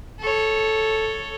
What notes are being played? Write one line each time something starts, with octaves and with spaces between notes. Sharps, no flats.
A4 C#5